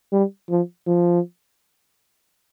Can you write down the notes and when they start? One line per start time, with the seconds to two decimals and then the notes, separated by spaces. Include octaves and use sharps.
0.13 G3
0.50 F3
0.87 F3